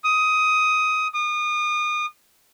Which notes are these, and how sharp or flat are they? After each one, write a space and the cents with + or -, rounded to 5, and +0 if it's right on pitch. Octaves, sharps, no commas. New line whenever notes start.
D#6 +15
D#6 -35